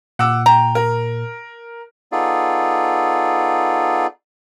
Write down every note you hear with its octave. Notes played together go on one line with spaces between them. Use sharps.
A#2 F#5 D6 E6
G5 A#5
A#4
B3 D#4 F4 G#4 A4 D5